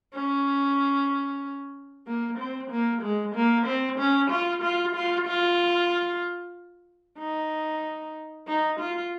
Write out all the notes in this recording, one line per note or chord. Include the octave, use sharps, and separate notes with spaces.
C#4
A#3
C4
A#3
G#3
A#3
C4
C#4
F4
F4
F4
F4
D#4
D#4
F4